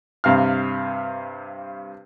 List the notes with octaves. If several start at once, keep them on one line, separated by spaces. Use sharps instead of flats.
G2 C3 F5 F6